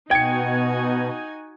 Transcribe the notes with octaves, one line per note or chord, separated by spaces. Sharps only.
B2 D#4 F#4 G5 G#5 G#6 C#7